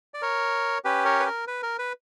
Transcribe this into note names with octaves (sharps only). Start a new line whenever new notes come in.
D5
A#4 C#5
C#4 G4 B4
A#4 C#5
B4
A#4
B4
A#4
B4